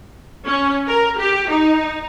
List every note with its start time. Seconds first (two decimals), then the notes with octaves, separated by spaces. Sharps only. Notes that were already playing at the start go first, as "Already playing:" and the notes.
0.45 C#4
0.87 A#4
1.19 G4
1.49 D#4